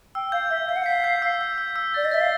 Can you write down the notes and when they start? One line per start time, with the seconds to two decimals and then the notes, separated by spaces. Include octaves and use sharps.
0.15 G5 E6
0.32 F5 G6
0.50 E5 E6
0.68 F5 G6
0.76 F#5
0.84 F5 B6
1.04 G6
1.22 E6
1.41 G6
1.58 E6
1.76 E6
1.94 D5 A6
2.05 D#5
2.12 E5 A6
2.21 F5